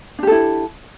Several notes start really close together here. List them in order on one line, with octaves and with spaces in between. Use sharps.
D4 G4 A4 E4